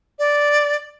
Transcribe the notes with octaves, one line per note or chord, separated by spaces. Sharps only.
D5